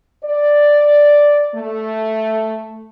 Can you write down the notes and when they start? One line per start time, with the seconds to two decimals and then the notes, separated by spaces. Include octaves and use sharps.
0.24 D5
1.55 A3